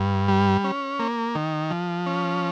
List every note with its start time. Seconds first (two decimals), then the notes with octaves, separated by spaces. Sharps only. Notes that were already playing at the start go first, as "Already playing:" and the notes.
Already playing: G2
0.28 G3
0.64 C#4
0.99 A#3
1.35 D#3
1.71 F3
2.06 C#4